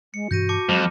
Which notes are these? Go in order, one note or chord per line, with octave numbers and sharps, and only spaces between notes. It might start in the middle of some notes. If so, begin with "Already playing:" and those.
G#3 C#7
G2 B2 E3 F#4 G6 A#6 D#7
A5 D6 C#7
F2 F#3 G#3